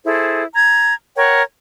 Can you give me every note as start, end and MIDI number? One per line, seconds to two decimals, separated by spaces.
0.05 0.43 64
0.05 0.43 68
0.05 0.43 69
0.05 0.43 72
0.54 0.94 82
0.54 0.94 92
1.16 1.43 70
1.16 1.43 73
1.16 1.43 78
1.16 1.43 79